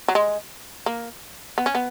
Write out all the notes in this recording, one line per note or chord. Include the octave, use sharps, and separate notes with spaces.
F#3
G#3
A#3
B3
C#4
B3